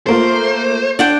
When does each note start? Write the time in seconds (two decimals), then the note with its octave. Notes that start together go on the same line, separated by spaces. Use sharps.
0.07 A3 A#3 F4 C5
0.99 D4 F#5 G5